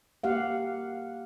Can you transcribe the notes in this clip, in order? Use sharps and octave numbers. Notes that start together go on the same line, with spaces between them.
A#3 G4 F5 F#5